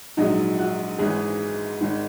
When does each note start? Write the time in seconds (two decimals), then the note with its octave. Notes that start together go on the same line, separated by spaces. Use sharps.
0.17 A#1 G#2 F#3 D#4
0.59 F#4
0.99 G#1 G#2 E3 G#4
1.81 G#1 G#2 D#3